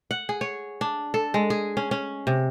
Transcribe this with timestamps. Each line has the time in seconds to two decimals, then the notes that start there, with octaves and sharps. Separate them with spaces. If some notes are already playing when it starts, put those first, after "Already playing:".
0.11 F#5
0.29 G#4
0.41 C#5
0.81 D4
1.14 A4
1.34 G#3
1.50 G#4
1.77 C#4
1.91 C#4
2.27 C3